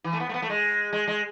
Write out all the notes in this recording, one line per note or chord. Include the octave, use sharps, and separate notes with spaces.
E3
A3
B3
A3
B3
A3
G#3
G#3
G#3